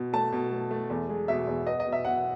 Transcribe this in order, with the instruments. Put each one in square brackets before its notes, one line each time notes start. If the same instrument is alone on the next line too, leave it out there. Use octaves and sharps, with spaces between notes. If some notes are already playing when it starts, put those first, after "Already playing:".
Already playing: [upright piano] B2
A3 A5
B2
A3
A3
E2
G#3
B2 E5
E2
B3 D#5
D#5
B2
E5
B2 F#5